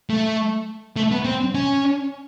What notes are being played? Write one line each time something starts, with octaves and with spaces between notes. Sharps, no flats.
A3
A3
B3
C4
C#4